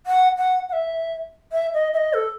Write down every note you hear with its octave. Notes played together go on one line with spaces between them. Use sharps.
F#5
F#5
F#5
E5
E5
D#5
E5
D#5
A4